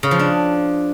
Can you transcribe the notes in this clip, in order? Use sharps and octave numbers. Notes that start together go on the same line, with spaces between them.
C#3
F3
D4